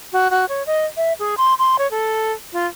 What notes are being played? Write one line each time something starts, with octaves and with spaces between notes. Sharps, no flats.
F#4
F#4
C#5
D#5
E5
G#4
C6
C6
C#5
A4
F4